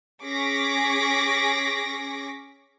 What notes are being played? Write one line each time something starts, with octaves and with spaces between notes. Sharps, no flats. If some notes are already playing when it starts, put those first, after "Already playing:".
C#4 G#4 C#6 D6 A#6 B6